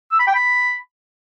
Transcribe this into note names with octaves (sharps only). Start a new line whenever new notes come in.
E6
B5
G5
B5